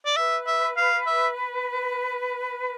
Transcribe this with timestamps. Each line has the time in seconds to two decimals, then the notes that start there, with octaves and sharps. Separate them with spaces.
0.05 D5
0.16 B4 E5
0.47 E5
0.77 F5
1.06 E5